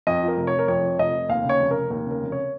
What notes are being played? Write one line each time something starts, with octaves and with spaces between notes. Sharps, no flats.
F2 D#5
F3
A#4
F1
C#5
F1
A#4
F2 C#5
F3
F1 D#5
F1
D#2 F5
C#3 C#5
F1
F1 A#4
D#2 A#4
C#3 A#4
F1
C#5